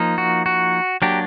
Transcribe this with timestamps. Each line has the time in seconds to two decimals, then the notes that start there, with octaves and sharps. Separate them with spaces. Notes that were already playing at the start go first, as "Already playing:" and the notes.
Already playing: F3 A#3 D#4
0.18 F#4
0.46 F#4
1.02 F#3 A#3 D4 G4